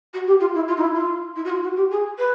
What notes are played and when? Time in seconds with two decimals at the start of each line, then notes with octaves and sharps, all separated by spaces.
0.14 F#4
0.27 G4
0.41 F4
0.55 E4
0.68 F4
0.77 D#4
0.81 E4
0.95 F4
1.36 E4
1.45 F#4
1.50 F4
1.63 F#4
1.77 G4
1.91 G#4
2.18 B4